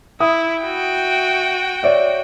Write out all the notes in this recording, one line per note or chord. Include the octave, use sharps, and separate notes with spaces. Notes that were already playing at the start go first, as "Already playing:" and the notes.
E4 E5 D#6
F#4 G5
C#5 D5 E5